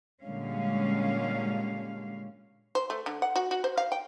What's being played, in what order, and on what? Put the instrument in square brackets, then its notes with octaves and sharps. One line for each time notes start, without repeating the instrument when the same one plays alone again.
[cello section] A#2 D3 G3 G#3 C#4 F5
[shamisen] C5
A3
D3
F#5
F#4
F#4
C5
F5
G5